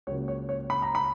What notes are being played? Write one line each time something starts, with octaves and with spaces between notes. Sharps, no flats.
C#2 C#3 F#3 A#3 C#5
C#5
C#5
B5
A#5
B5